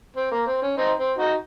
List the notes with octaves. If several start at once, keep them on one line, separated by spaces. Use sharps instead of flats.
C4
A#3
C4
C#4
C4 D#4
C4
D#4 F#4